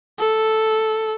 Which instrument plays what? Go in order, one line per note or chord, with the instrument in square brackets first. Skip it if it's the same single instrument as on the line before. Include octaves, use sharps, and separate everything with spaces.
[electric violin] A4